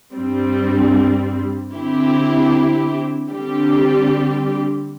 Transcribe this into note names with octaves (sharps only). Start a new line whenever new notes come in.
G2 G3 C4
D3 C4 E4 G4
D3 G3 C4 G4